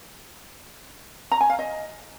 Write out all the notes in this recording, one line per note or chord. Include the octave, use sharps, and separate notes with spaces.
A#5
G#5
F5
D#5